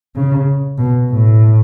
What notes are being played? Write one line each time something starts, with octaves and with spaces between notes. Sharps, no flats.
C#3
B2
A2